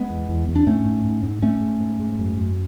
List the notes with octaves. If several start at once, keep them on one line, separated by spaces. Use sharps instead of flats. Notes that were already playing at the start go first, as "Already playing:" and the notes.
Already playing: G#3 B3
E2
E2
E2
D4
G#2 A3 C#4
G#2
G#2
G#2
G#2 A3 C#4
G#2
G#2
G#2
F#2
F#2